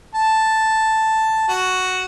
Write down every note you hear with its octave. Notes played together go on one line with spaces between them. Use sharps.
A5
F#4